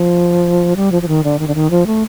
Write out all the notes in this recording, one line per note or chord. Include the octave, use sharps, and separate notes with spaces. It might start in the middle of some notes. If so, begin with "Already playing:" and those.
Already playing: F3
G3
F3
F3
D#3
D3
D#3
D3
D#3
F3
A3